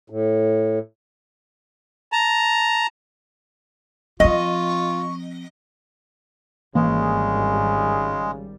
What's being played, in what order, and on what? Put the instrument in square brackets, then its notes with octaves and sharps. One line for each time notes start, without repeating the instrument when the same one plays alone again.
[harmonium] A2
[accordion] A5 A#5
[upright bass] F3 C4 [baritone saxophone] F4 [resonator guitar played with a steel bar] D#5 [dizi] C#6
[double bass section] G#1 G3 [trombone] C#3 [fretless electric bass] E3 A#3 [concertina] G#3